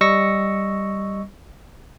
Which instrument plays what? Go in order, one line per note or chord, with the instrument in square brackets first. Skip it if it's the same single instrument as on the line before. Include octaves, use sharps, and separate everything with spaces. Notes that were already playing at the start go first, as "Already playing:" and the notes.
[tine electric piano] G3 D#5 C#6 E6 A#6 C#7